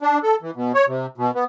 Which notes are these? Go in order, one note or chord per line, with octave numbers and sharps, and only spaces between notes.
D4
A4
E3
B2
C#5
C3
B2
B3